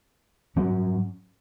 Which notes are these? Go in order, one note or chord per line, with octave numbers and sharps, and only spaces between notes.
G#2 F#3 C#4